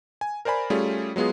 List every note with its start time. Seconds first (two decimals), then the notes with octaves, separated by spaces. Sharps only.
0.21 G#5
0.45 A#4 C5 D5 G#5 B5
0.70 G3 A3 C#4 F4 G#4
1.16 F#3 G#3 B3 F4 G#4